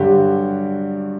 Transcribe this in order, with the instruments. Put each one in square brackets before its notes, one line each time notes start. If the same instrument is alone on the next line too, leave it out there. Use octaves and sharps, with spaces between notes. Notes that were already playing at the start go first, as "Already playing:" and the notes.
Already playing: [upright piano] G2 D3 F#3 F#4 G4